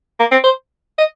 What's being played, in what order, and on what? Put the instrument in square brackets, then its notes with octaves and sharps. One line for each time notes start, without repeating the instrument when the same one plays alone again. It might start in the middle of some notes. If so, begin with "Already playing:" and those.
[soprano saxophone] A#3
C4
C5
D#5